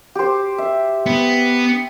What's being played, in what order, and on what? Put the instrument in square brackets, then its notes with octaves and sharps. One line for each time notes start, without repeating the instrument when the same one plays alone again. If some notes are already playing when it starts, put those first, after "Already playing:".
[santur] G4 C5
E5
[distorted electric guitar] B3